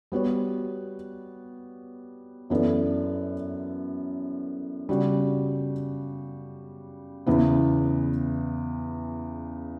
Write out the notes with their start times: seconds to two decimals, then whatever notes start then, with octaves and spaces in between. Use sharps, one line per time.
0.12 G3 B3 F#4 C#5
2.50 F#2 E3 B3 D4 A4
4.89 C#3 G3 D4 F#4
7.27 E2 C#3 E3 B3